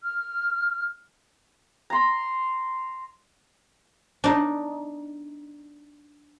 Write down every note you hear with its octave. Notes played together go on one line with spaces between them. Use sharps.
F6
A#5 C6
D4 D#4